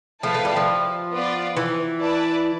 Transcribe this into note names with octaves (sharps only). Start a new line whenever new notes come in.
F3 A3 E4 B4 F5 A5
A3
G3
F3
B3 F4 B4 D5
E3
E4 B4 D5 A5